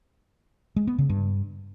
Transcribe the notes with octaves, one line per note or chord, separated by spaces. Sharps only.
G#3
B3
C#3
G2